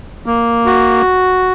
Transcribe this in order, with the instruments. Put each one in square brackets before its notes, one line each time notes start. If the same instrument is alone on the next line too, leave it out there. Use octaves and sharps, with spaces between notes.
[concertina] A#3
F#4